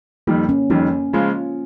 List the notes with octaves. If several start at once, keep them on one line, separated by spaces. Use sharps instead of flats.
F2 D#3 G3 A#3
C#4
F2 D#3 G3 C#4
C#3 F3 G#3 F4